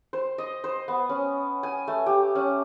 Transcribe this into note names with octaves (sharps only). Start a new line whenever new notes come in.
C5
D#5
C5
B3
C#4
G#5
A3
G4
C#4